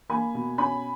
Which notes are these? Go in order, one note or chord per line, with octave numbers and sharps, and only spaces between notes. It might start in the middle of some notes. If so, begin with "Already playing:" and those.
A#3 G#5 B5
B2
C#4 G#5 B5